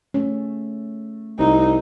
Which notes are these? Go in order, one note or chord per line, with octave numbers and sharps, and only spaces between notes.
A3 C#4
C2 D#4